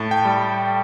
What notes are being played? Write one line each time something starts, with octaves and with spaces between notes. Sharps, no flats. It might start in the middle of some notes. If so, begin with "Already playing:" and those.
Already playing: A2 A5
G5
G3